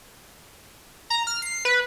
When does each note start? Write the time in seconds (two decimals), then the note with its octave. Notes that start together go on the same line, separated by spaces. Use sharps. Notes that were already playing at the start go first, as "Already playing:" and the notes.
1.10 A#5
1.27 F6
1.42 C7
1.65 B4